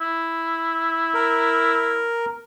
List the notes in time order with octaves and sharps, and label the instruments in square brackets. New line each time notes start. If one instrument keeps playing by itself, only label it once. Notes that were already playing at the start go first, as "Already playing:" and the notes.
[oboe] E4
[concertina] A#4